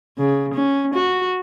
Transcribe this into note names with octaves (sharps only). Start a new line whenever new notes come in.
C#3
C#4
F#4